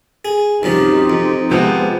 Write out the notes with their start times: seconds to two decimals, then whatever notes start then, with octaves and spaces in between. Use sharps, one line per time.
0.25 G#4
0.63 C2 F#2 F3 C4 D#4 G4
1.10 F2
1.51 C3 F3 G#3 B3 C5